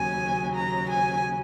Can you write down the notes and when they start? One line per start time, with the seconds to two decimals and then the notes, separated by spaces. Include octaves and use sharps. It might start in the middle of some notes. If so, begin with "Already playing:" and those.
Already playing: D#2 C#3 F#3 G#5
0.56 A#5
0.90 G#5